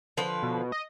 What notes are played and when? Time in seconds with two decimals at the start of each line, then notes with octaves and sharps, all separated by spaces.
0.17 D3 F3 B4
0.43 B2
0.72 D#5